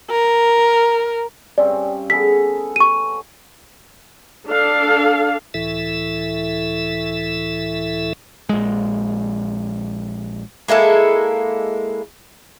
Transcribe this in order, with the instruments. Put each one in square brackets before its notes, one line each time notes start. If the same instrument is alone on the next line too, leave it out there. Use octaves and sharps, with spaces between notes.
[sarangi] A#4
[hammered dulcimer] G2 C4 C#4 [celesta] D5
[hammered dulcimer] B3 G#4 A4 [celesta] B6
[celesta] C#6 D#7
[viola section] D4 A4 F5
[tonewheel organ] C#2 A2 E3 E4 A4 E5
[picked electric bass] A#1 G#3
[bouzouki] G#3 A#3 E4 A4